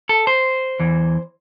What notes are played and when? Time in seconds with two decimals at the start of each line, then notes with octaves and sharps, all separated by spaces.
0.09 A4
0.27 C5
0.79 E2 E3